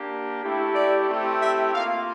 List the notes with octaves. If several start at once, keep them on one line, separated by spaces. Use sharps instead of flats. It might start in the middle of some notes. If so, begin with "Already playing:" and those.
Already playing: A#3 D4 G4
A3 E4 G4
D5
A3 C4 E4 G4
E5
A#3 F4 F5